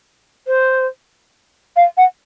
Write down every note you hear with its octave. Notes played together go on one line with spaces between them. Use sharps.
C5
F5
F#5